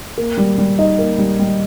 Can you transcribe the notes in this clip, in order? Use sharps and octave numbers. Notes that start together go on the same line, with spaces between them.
A#3
G3
G3
D#4
A#3
G3
G3